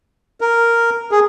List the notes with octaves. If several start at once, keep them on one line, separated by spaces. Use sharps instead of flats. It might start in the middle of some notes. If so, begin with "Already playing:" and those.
A#4
G#4